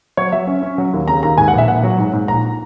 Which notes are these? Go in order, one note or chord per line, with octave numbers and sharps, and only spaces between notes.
F#3 C#5
F#3 E5
C#4
C#4
F#3
D#2
C#3 A#5
D#2 A#5
G#2 G#5
F#5
A#1
E5
A#1 F#5
F#3
G#2
G#2
A#1 A#5